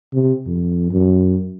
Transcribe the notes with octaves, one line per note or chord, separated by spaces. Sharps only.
C3
F2
F#2